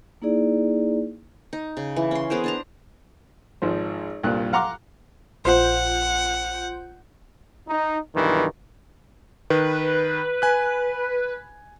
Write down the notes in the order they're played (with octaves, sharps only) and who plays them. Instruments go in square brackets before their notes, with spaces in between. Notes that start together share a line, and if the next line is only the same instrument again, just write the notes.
[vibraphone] A#3 D#4 E4 G#4 D5
[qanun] D#4
C#3
E3
C#4 C6
B3 G#4 A#4 C5
D4 A5 A#5
[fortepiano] G#1 G#2 F3 C5
C2 G2 A#2 F4 F#6
F5 F#5 A#5 C6 D6
[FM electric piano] A#1 F4 G6 [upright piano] C5 [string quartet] F#5
[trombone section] D#4
B1 G2 D#3 E3
[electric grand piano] D#3 [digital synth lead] B4
[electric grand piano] G#5 F#6